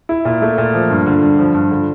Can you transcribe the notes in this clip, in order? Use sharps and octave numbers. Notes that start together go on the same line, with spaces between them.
E4
A#2
A3
A#2
F3
G2
D3
G2
F3
G2
D3